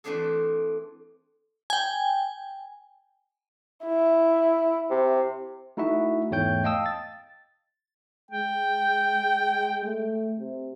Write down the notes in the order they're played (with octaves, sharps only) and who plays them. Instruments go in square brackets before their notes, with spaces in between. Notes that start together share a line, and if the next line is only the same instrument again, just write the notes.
[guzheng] E3 A3 C4 D4 G#4 A4
[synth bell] G5 G#5
[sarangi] E4
[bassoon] C3
[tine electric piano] A3 D#4 E4 F#4 E5
E2 G#2 A3 C#5 G5 G6
D#5 F5 G5 A5 D#6 E6
A6
[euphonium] G#3 [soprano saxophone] G5
[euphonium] A3
C3